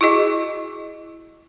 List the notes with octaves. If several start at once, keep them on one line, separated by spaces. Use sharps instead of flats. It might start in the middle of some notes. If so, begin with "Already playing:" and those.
E4 F#4 G#4 D#5